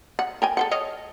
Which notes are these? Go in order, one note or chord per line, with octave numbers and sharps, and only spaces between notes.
F#5
A#4 G5 G#5
A4 C5 F#5
C#5 D#5 F5